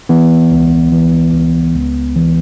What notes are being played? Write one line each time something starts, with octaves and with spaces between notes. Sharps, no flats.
E3 B3
C#2
E3
C#2
C#2
E3